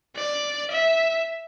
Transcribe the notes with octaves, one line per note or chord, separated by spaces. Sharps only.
D5
E5